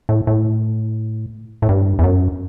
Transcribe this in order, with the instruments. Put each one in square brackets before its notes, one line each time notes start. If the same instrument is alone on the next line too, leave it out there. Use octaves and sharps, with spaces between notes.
[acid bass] A2
A2
A2
G2
E2
F#2